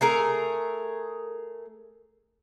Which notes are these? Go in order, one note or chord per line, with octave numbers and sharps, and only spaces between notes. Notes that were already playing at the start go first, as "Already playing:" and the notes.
A3 G#4 A#4